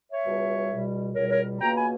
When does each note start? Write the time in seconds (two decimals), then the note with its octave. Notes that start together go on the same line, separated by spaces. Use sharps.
0.12 C#5 E5
0.24 C#2 B2 G3
0.69 C#2 B2 G3
1.15 C#2 B2 G3 A#4 C#5
1.30 A#4 C#5
1.60 C#2 B2 A#3 G5 A#5
1.76 G#5 B5